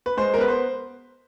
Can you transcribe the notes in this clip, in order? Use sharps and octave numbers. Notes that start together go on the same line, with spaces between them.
B4
G#3 C5
A#4
B3 B4
C5